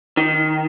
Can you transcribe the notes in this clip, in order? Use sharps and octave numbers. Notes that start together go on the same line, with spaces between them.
D#3